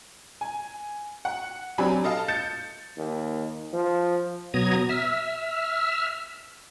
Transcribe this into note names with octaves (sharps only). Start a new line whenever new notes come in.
G#5
F#5
F#3 C4 D4 G4 G#5 B5
A4 D#5 F5 A5
G6 A6 C#7 E7
D#2
F3
B2 F#3 B3 A#5 D#6 G#6
E5 E6 F6